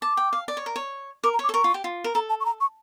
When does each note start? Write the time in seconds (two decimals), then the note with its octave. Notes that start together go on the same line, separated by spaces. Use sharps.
0.02 A5 D6
0.17 G5
0.33 F5
0.48 D5
0.57 C#5
0.66 A#4
0.76 C#5
1.24 A#4 D6
1.33 A#5
1.39 C#5 D6
1.49 A4
1.54 A#4 C#6
1.64 F4
1.74 G4
1.84 F4
2.04 A#4
2.15 A4 A#5
2.29 A5
2.40 C#6
2.45 A#5
2.61 C#6